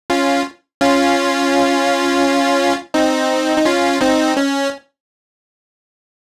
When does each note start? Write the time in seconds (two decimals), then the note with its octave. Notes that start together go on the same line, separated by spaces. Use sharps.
0.10 C#4 F4
0.81 C#4 F4
2.94 C4 D#4
3.57 D#4
3.65 C#4 F4
4.01 C4 D#4
4.37 C#4